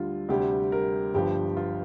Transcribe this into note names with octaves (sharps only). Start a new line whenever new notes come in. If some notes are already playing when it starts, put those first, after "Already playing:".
Already playing: D2 D3 G3 F4
D2 C3 G3 G4
A#4
G1 G2 F3 G4
F4